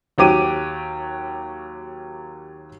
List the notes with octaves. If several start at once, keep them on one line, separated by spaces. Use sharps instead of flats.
D#2 F#3 G4 D6 D#7